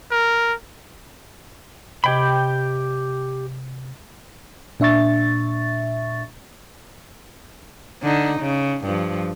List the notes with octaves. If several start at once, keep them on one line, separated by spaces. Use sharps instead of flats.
A#4
C3 G4 D#5 G5 B5 G#6
A#2 D4 E5 C#6 A6
D3 D#4
C#3
G2 F3